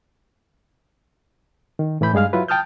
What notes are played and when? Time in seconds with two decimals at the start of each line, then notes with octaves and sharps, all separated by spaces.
1.79 D#3
2.01 A2 E3 E4 B5 G6
2.14 G2 G#3 G#4 F5 F6
2.33 F#3 E4 F4 B4
2.48 G5 A5 D#6 F6 G6